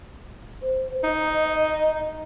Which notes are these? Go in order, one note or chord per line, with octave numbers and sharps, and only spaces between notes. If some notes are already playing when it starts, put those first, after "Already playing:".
C5
D#4 D#5